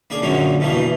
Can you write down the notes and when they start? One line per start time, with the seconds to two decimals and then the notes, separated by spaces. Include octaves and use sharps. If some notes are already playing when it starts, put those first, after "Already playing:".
0.10 A#3 D4 G#4
0.22 F#2 A#2 D3 F#3 G#3 A#3
0.60 G2 B2 E3 F3 A#3
0.77 E3